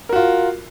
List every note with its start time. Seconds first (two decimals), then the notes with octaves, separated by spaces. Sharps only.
0.09 A#4
0.13 F#4
0.16 F4